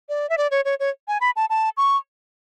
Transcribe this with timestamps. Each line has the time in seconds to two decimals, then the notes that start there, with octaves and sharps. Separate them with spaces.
0.09 D5
0.30 E5
0.38 D5
0.51 C#5
0.65 C#5
0.80 C#5
1.08 G#5
1.21 B5
1.36 A5
1.50 A5
1.77 C#6